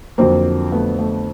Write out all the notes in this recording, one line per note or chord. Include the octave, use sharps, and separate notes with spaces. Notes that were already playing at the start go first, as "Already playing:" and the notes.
F2 D3 F#3 A#3 C4
A3 B3
A3 B3